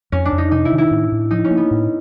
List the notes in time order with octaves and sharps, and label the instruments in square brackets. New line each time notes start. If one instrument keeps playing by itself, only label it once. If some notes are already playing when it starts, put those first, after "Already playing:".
[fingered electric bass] F2 [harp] C#4
[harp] D4
[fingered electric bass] F2
[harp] D#4
[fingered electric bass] C3 [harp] D#4
[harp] E4
[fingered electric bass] D#3
[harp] E4
[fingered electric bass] A2
A2
[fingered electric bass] F3 [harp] D#4
[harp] C#4
[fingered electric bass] A#3
[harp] B3
[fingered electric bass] A2